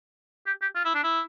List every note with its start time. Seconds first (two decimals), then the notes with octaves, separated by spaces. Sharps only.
0.46 G4
0.61 G4
0.75 F4
0.85 E4
0.94 D4
1.03 E4